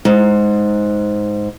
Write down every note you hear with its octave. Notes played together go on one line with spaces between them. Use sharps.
G#2